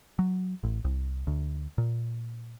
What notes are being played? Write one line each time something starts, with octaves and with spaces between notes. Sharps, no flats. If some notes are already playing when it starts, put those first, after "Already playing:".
F#3
A1
C2
D2
A#2